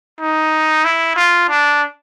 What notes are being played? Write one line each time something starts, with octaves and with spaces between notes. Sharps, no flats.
D#4
E4
F4
D4